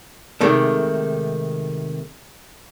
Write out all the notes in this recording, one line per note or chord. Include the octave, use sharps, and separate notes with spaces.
C3 D#3 G#3 A3